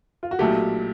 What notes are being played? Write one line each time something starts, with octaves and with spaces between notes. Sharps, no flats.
F4
F#4
B1 A#2 F#3 A3 G4